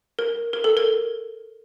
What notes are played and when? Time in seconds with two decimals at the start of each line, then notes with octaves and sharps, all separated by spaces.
0.19 A#4
0.53 A#4
0.64 A4
0.77 A#4